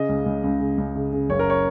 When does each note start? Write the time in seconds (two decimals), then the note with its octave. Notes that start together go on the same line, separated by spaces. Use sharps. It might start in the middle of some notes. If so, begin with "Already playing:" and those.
Already playing: C#3 D#5
0.09 C#2
0.26 C#2
0.44 C#2
0.60 C#3
0.78 C#2
0.96 C#3
1.13 C#3
1.29 F#1 C#5
1.39 A#4
1.50 C#5